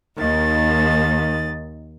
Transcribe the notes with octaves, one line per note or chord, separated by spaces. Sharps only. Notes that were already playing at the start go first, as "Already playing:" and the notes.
D#2 D#3 A6